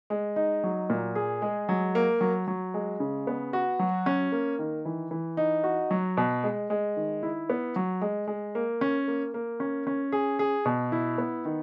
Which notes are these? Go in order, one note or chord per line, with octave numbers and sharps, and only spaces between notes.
G#3
D#4
F#3
A#2
G#4
G#3
F#3
A#3
F#3
F#3
G#3
C#3
B3
F#4
F#3
C#4
A#3
D#3
E3
E3
D#4
F#4
F#3
B2
G#3
G#3
D#3
E4
B3
F#3
G#3
G#3
A#3
C#4
A#3
A#3
C#4
C#4
G#4
G#4
B2
E4
B3
D#3